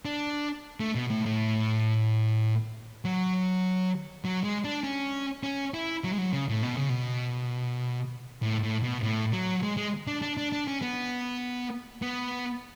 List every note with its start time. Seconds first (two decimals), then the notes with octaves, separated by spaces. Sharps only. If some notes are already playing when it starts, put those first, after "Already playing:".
0.05 D4
0.80 A3
0.95 B2
1.10 A2
1.26 A2
3.05 F#3
4.25 F#3
4.44 G#3
4.65 D4
4.83 C#4
5.43 C#4
5.74 E4
6.04 F#3
6.13 G#3
6.18 F#3
6.33 C#3
6.49 A2
6.63 B2
6.77 C#3
6.89 B2
8.43 A2
8.63 A2
8.83 B2
9.03 A2
9.33 F#3
9.63 G#3
9.77 G#3
10.07 D4
10.22 D4
10.37 D4
10.52 D4
10.68 C#4
10.82 B3
12.02 B3